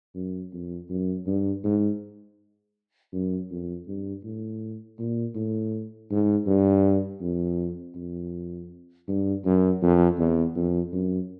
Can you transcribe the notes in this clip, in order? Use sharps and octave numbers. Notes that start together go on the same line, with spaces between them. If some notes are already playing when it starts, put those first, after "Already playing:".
F#2
F2
F#2
G2
G#2
F#2
F2
G2
A2
A#2
A2
G#2
G2
F2
F2
G2
F#2
F2
E2
F2
F#2